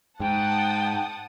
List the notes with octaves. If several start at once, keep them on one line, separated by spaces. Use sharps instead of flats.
G#2 F#5 G5 A5 D#6